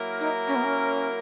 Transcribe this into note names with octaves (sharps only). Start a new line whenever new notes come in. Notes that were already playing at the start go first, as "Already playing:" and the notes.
Already playing: F#3 A#3 E4 A#4
D#4
C#4
B3
C#4